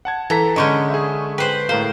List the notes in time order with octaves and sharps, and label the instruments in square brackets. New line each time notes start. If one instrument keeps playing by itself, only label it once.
[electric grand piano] F#5 A5 G#6
[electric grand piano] E3 A4 B6 [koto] A#5
[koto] D3 G#3 C#4 [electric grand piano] D#5 C#6 G6
[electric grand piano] G#4 E5
[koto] B4 C5 [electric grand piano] G5
[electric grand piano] A2 A#4 F5 [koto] C5